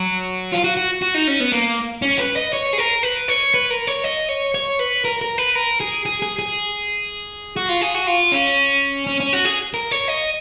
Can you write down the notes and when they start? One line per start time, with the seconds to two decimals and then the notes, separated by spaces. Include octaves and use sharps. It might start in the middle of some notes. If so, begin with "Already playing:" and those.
Already playing: F#3
0.52 F4
0.64 F#4
0.77 F#4
1.02 F#4
1.14 D#4
1.28 C#4
1.40 B3
1.52 A#3
2.02 C#4
2.19 B4
2.36 D#5
2.53 C#5
2.73 G#4
2.78 A#4
3.03 B4
3.28 C#5
3.54 B4
3.70 A#4
3.87 C#5
4.04 D#5
4.29 C#5
4.54 C#5
4.79 B4
5.05 A#4
5.21 A#4
5.38 B4
5.55 A#4
5.80 G#4
6.06 G#4
6.22 G#4
6.39 G#4
7.57 F#4
7.69 F4
7.81 G#4
7.94 F#4
8.07 F4
8.32 C#4
9.07 C#4
9.20 C#4
9.33 F#4
9.45 G#4
9.74 A#4
9.91 C#5
10.08 D#5